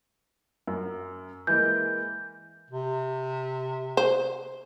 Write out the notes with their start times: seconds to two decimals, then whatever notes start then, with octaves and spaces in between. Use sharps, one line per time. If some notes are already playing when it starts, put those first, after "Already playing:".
0.67 F#2
1.47 E3 G#3 A#3 G6
2.70 C3
3.97 C5